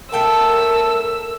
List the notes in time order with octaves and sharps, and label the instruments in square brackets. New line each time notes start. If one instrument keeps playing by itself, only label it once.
[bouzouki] A3 G5 A5 [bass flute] A#4 [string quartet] E6